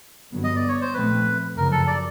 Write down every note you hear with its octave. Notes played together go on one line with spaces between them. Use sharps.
G2 D3 F#3 B3
D#5
D5
C#5
C5
A#2 F3 A3 C4 B4
F#2 C#3 F3 A#4
A4
D5